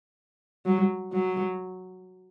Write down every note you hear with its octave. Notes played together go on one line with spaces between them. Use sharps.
F#3
F#3